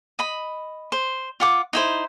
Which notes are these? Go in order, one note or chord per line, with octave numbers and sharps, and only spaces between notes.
D#5 B5
C5
F4 F#5 D6
D#4 E4 C5